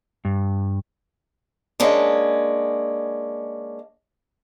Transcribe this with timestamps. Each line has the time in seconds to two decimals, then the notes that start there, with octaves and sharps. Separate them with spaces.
0.25 G2
1.80 G#3 A#3 C#4 D4